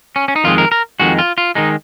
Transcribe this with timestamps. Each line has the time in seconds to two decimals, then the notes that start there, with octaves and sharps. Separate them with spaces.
0.16 C#4
0.28 C#4
0.36 D#4
0.44 F2 D#3 G#3 F4
0.58 A#4
0.72 A#4
1.00 F2 D#3 G#3 F#4
1.18 F4
1.38 F4
1.55 D#3 G#3 D#4